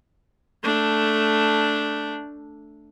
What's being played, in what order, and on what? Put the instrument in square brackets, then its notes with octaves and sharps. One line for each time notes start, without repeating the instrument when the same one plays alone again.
[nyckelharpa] A3 D4